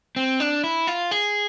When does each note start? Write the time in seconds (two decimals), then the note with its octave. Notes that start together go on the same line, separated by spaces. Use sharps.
0.16 C4
0.40 D4
0.64 E4
0.87 F4
1.11 G#4